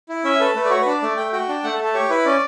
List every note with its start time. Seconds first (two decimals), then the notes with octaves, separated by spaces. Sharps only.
0.09 E4
0.24 C#4 E5
0.40 A4 B4
0.55 A3 B4
0.65 D5
0.70 F#4 C#5
0.82 D4 B4
0.91 D5
1.02 A3 D5
1.17 A3 G5
1.33 F#4 G5
1.49 D4
1.64 A3 F#5
1.74 A4
1.79 A3
1.84 A4
1.94 G4 C#5
2.10 E4 B4
2.26 C#4 D5